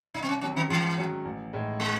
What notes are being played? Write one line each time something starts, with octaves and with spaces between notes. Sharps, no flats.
C2 D#4
C4
C#4
C3 D#3 F#3 C#4
D#3
G#2 E3
D#3 F#3 C#4 F#4
A1
A2 G#3 D#4
G#3